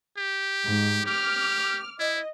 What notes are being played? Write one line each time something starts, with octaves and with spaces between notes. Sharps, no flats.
G4
G#2
G4 D6 F6
E4 D#5